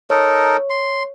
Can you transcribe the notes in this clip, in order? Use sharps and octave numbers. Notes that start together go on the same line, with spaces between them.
D#4 A4 A#4 C#5
C6